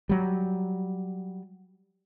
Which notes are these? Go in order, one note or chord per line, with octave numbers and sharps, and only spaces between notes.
F#3 G3